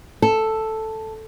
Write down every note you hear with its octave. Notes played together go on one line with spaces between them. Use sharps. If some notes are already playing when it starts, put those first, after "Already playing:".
A4